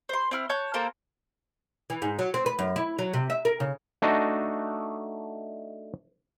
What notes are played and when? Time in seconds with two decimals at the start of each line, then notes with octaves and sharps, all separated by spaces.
0.09 C5 C6
0.31 C4 E4 F6
0.49 C#5 A5 F#6 G6
0.74 A#3 A4 A#4 C5
1.90 E3
2.02 G#2
2.19 F#3
2.34 C4
2.46 B4
2.59 F#2
2.76 E4
2.99 F#3
3.14 C3
3.30 E5
3.45 A#4
3.60 C#3
4.02 A3 D4 D#4 F#4 D#5